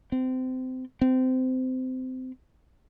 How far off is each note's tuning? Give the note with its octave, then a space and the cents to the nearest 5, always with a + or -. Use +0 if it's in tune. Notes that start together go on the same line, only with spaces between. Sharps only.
C4 -25
C4 -25